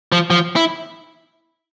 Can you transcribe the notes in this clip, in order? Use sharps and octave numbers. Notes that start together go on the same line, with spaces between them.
F3
F3
E4